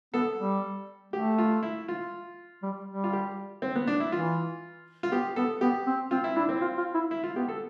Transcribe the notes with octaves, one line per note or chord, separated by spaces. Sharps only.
B3 A4
G3
A3 G4
F4
E4
F4
G3
G3
F4
G4
C4
B3
D4
E4
E3 F4
F4
B3 G4
B3 A4
B3 G4
C4
C4 F4
E4
D4 E4
C4
F4
F4
E4
E4
F4
B3 G4
A4